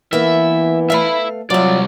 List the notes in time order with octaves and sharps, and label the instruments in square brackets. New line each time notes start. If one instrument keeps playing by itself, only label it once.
[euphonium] E3 [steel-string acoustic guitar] A#3 B3 [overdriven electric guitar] E5
[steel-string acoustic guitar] A3 F5 [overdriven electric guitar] E5 B5
[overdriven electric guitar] C2 D5 [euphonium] F#3 [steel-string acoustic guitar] F4 E5